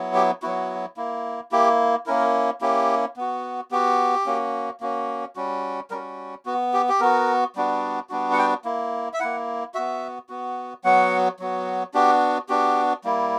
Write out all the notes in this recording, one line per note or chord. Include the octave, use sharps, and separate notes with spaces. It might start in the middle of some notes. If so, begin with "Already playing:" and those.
Already playing: F#3 B3 E4
G4
F#3 B3 E4 F#4
A#3 E4
A#3 E4 G4
A#3 C#4 E4 A#4
A#3 C#4 E4 G4
B3 F#4
B3 F#4 G4
A#3 C#4 F#4
A#3 C#4 F#4
G3 C#4 F#4
G3 C#4 F#4 A#4
B3 F#4
G4
G4
B3 F#4 A#4
G3 B3 D4 F#4
G3 B3 D4 F#4
F#5
G5
A#3 E4
E5
A#3 E4 F#5
B3 F#4 E5
B3 F#4
F#3 B3 F#4 F#5
F#3 B3 F#4
B3 D4 F#4 G4
B3 D4 F#4 G4
G3 A#3 E4